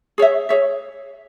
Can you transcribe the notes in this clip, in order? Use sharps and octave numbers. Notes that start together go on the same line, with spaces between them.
G#4 C#5 E5
G#4 C#5 E5